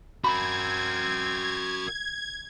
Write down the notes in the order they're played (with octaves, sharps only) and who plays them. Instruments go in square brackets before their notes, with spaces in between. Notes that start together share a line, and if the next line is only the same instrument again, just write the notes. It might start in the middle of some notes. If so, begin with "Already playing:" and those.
[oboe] C4 [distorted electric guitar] F#4 A#4 [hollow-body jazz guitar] B5 [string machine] G#6